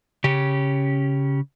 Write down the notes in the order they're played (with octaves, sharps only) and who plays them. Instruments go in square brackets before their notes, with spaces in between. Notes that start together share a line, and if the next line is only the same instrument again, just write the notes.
[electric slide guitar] C#3 C#4 G4